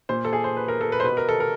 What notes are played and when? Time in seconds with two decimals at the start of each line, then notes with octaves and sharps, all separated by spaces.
0.09 A#2 C5
0.25 A4
0.33 G#4
0.44 C5
0.57 B4
0.68 A#4
0.81 A4
0.92 B4
1.00 C5
1.04 B2 B4
1.17 A#4
1.29 A4
1.40 A#4